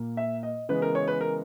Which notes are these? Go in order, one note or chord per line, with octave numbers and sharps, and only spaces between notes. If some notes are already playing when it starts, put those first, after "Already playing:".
Already playing: A#2 A#3
E5
D#5
C#3 E3 G#3 B3 B4
A#4
C#5
B4
A#4